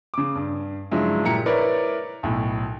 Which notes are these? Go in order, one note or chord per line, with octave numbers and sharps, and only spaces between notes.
C#3 D6
G2
G2 C#3 F3 F#3 G#3 E4
A#2 G#3 E4 G4 A#5 C#7
E4 A#4 B4 C#5 D5
B1 A2